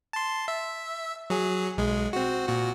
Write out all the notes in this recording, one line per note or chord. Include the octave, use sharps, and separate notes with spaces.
A5 C6
E5
F#3 G#4
B1 G#3
C4 F#4
A#2 F#4